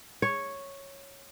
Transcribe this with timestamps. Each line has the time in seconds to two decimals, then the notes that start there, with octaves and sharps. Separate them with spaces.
0.22 C#5